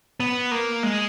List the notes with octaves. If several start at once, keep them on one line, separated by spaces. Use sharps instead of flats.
B3
A#3
G#3